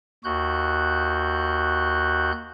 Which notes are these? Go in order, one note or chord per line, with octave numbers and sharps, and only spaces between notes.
D#2 F#4 F#6 G6